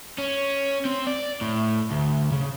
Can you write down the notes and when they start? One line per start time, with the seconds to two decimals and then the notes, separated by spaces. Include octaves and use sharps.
0.18 C#4
0.85 C4
1.07 D5
1.41 A2
1.91 D2
2.32 C#3